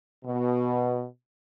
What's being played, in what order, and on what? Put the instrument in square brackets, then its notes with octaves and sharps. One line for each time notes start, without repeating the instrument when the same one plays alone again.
[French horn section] B2